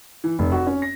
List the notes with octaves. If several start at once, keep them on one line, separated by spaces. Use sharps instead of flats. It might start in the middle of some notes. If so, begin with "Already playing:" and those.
E3
F1
F#4
C#4
A#6